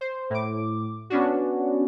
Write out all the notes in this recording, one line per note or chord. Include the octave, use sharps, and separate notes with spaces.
C5
A2 D6
B3 C#4 D4 F#4